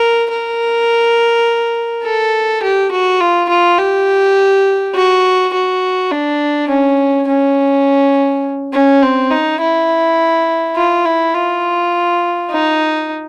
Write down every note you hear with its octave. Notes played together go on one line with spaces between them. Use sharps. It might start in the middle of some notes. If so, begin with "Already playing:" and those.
Already playing: A#4
A#4
A4
G4
F#4
F4
F4
G4
F#4
F#4
D4
C#4
C#4
C#4
C4
D#4
E4
F4
E4
F4
D#4